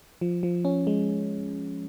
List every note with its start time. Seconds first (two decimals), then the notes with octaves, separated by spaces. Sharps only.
0.21 F3
0.43 F3
0.65 C#4
0.87 G#3